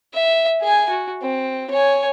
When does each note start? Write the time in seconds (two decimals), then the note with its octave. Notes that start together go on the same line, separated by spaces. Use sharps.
0.13 E5
0.61 G#4 G#5
0.90 F#4
1.22 C4
1.71 C#5 G#5